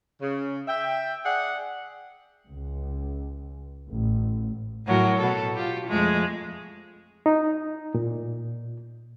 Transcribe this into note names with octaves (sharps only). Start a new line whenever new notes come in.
C#3
E5 G5
G#4 D5 F#5
C#2
A1
A2 F#3 A#4
B2 A4
F4 G4
F2 G#3 A3
D#4
A#2